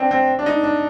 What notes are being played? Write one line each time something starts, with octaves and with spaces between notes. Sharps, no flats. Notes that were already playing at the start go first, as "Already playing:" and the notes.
Already playing: C4 D4
C4
D4
D#4
D4